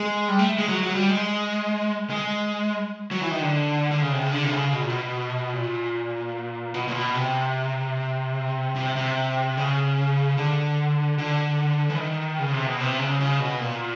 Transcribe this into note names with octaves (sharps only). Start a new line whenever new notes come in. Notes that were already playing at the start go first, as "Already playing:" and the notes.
Already playing: G#3
G3
A3
G#3
F#3
F#3
G3
G#3
G#3
F#3
E3
D#3
D3
D3
C#3
C3
C#3
D3
C3
C#3
B2
A#2
B2
A#2
B2
A#2
B2
C3
C3
C3
C#3
D3
D3
E3
D#3
C#3
C3
B2
C3
C#3
C#3
B2
A#2